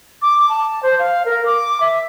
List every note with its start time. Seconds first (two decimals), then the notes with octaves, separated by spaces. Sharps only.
0.22 D6
0.49 A5
0.83 C5
0.99 F5
1.26 A#4
1.46 D6
1.81 E5